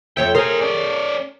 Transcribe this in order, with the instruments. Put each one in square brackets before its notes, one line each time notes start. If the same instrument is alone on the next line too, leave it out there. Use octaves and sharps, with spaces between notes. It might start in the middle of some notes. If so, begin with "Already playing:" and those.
[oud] F2 C#5 E5 [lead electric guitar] G5
[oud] G#4 A#4 [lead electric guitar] C5 G#5
[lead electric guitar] C#4 D5